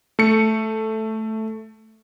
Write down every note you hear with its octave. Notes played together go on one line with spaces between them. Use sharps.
A3 C#7